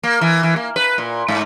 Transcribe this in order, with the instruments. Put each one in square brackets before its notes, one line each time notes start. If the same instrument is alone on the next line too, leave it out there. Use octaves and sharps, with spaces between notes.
[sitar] A#3
E3
E3
A#3
B4
A#2
G#2